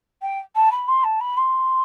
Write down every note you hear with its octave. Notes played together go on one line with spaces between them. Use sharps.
G5
A5
B5
C6
A5
B5
C6